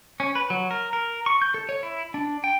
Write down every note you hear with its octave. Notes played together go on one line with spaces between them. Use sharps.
C#4
B4
F#3
A#4
A#4
C#6
G6
A4
C#5
E4
D4
G5